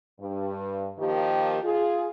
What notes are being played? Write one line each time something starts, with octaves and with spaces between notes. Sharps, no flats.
G2
D#3 F3 A#3 G4
F4 G#4